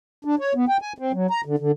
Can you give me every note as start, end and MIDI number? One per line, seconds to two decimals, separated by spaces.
0.25 0.35 62
0.39 0.53 73
0.55 0.65 59
0.68 0.77 79
0.82 0.93 80
0.98 1.12 60
1.13 1.27 54
1.30 1.41 82
1.45 1.56 50
1.59 1.72 50